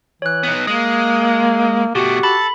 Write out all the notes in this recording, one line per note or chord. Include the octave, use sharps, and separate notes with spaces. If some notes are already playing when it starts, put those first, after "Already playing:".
E3 C#5 F#6
B3 D#4
G#3 A#3 D#6
B2 A3 F#4 G4
A4 B5